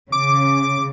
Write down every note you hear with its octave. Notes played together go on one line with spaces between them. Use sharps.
C#3 D6